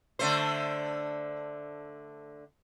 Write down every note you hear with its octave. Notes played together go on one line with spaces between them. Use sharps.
D3 A3 C5